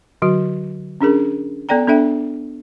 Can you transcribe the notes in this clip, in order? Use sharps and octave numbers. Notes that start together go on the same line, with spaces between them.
D3 F#3 F#4
C#4 D4 G#4 A#4
B3 A4 D5 G5 A#5
B3 D4 A4 E5 G5